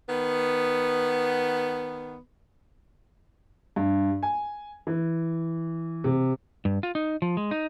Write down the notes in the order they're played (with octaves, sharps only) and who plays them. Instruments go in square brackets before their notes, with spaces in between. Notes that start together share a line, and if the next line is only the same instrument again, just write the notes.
[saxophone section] D#3 B3
[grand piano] G2
G#5
E3
C3
[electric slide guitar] G2
F4
D#4
F3
G#3
D#4